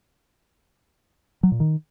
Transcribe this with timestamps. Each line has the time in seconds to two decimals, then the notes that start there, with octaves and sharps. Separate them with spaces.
1.43 F#3
1.52 A#2
1.60 D#3